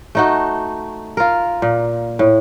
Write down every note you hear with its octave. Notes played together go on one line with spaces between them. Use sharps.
A3 D#4 F#4
F4 A#4
A#2
A2